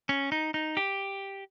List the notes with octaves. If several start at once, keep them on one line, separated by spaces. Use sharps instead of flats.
C#4
D#4
D#4
G4